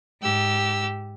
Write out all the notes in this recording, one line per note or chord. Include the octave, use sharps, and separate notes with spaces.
G#2 G4 E6